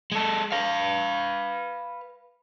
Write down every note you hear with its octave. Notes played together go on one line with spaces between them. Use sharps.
G#3 A4
B4 F5